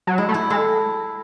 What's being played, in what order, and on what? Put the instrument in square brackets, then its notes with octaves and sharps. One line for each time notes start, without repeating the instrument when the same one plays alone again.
[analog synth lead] F#3
[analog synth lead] G#3 [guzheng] E4
[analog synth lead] A3
[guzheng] E4
[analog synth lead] G#3 [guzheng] A4